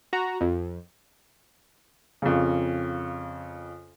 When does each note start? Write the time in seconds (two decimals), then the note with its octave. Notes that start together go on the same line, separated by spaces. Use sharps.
0.13 F#4 A#5
0.41 F2
2.22 F2 C#3